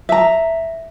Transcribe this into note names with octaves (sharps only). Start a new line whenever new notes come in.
E5 A#5